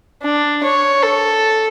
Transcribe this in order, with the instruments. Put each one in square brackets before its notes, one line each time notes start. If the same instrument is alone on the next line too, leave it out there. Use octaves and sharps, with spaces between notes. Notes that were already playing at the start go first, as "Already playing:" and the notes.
[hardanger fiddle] D4
C#5
A4